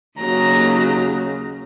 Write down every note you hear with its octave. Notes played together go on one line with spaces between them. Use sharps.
D#2 C#3 F#3 A#5